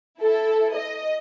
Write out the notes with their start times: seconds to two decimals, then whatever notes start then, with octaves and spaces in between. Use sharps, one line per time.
0.19 E4 A4
0.74 D#5